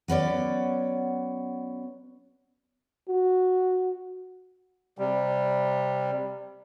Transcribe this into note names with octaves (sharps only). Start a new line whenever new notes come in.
F#3 B3 C#4 D5
F#4
C3 G3